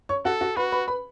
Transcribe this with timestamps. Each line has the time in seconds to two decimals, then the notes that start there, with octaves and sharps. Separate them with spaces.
0.09 C#5 C#6
0.25 F#4 A4 F#5
0.41 F#4 F#5
0.56 F#4 B4 B5
0.72 B4 B5
0.88 B4 B5